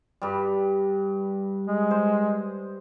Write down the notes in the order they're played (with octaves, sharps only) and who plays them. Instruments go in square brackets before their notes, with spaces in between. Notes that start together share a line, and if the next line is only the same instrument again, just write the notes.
[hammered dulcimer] G2 G3
[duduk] G#3
[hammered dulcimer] C5